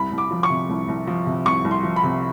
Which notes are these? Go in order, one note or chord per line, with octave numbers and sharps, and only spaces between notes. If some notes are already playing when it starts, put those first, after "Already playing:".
Already playing: C2 B5
C2
D6
F3
C#6
C3
C2
C2
F3
C3
C2 C#6
C2
C6
F3
B5
C3